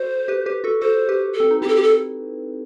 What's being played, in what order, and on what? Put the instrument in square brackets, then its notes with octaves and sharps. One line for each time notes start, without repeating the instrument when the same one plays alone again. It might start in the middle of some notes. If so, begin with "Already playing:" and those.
Already playing: [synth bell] F#4 A4 [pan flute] C5
[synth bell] G4 B4
G4 B4
F#4 A4
[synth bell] F#4 A4 [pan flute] C5
[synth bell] G4 B4
[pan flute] A4
[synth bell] C4
D#4
[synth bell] C4 E4 [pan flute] G4
[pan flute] A4
G4
A4